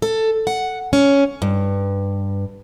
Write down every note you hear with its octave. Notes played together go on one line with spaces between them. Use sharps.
A4
F#5
C#4
G2